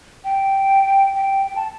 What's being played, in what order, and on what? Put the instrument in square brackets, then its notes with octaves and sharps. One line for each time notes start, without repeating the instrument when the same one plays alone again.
[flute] G5
G5
G5
A5